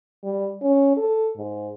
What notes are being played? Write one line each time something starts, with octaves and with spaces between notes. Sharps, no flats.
G3
C#4
A4
G#2